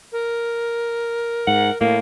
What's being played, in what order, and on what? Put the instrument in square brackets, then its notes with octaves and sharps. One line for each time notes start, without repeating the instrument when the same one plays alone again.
[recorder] A#4
[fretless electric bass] G#2 [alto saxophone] F#5
[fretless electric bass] A2 [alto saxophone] A#3